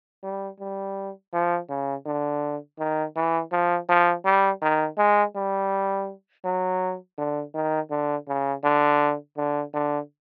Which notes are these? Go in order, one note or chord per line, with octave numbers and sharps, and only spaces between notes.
G3
G3
F3
C#3
D3
D#3
E3
F3
F3
G3
D#3
G#3
G3
F#3
D3
D#3
D3
C#3
D3
D3
D3